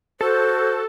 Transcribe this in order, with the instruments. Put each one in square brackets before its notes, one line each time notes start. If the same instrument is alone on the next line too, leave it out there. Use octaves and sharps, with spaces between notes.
[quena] F#4 [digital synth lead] A4 [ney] C5